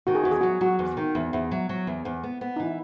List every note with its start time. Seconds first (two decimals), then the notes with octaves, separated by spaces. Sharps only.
0.07 D#3 F#4
0.15 G#4
0.24 E2 F#4
0.31 G#4
0.41 F#3 F#4
0.61 F#3 F#4
0.79 E2
0.97 D#3
1.15 E2
1.33 E2
1.51 F#3
1.69 F#3
1.87 E2
2.05 E2
2.24 B3
2.41 B3
2.56 D#4
2.60 E3 E4